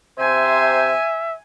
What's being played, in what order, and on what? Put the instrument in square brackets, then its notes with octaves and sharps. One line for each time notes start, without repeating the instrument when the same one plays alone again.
[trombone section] C3 C5 [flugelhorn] E5 [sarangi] G#5